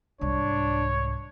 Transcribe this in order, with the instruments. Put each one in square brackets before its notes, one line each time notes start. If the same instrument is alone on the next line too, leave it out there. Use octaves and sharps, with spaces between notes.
[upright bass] C2 G#2 [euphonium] D4 [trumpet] C#5